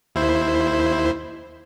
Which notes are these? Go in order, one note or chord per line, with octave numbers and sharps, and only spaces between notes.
D#2 E4 C5